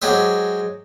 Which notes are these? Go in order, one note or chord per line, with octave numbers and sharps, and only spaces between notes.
F#3 G#3 G4 C5 E5